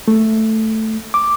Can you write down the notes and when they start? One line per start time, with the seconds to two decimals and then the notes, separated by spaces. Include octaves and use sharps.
0.08 A3
1.14 D6